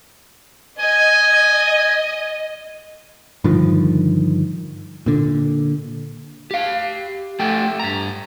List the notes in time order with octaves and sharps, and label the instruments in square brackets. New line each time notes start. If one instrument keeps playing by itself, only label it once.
[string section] D#5 [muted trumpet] G#5
[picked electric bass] G2 D3 D#3 F3
A#2 D3
[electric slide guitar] G4 F5
A3 G4 A4 G5
G2 A#5